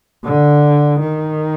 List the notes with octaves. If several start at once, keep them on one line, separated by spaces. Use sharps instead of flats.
D3
D#3